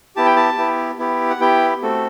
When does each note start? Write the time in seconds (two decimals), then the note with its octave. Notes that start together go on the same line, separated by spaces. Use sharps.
0.16 B3 E4 G4 A5
0.25 G5
0.36 A5
0.57 B3 E4 G4
0.98 B3 E4 G4
1.30 F#5
1.40 B3 E4 G4 G5
1.82 A3 C4 F#4 A4